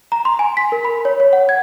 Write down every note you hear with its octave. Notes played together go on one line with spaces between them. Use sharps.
A#5
C6
G#5
B6
A#4
B5
C#5
C#5
F#5
G#6